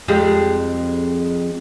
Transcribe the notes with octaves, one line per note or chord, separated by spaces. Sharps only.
F2 G3 G#3